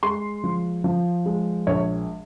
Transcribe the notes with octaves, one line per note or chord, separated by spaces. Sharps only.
G#3 C6
F3
F3
G#3
A#1 C#5